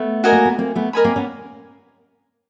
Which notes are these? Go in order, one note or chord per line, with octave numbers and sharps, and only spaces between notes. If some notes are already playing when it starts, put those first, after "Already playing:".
Already playing: A3 B3
F#4 A#4 D#5 G#5
A#3
B3
A#3 C4
A3 B3
A#4 D#5 G#5 B5
A#3 C4
B3 C#4